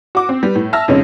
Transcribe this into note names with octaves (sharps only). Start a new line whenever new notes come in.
F#4 D6
C4
G3 B4
A2
E5 A5 E6 F6 A#6
F2 C#3 G#3 C#4 D#4